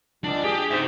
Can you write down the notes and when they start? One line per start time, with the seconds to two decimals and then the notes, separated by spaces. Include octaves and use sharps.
0.24 C#2 D4 D5
0.44 G4 G#4
0.71 G#2 C5 E5